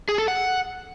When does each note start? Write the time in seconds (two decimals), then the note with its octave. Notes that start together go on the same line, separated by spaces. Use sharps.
0.09 G#4
0.18 A4
0.28 F#5